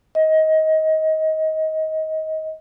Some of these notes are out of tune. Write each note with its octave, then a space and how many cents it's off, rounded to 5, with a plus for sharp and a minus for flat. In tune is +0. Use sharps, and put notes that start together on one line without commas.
D#5 +20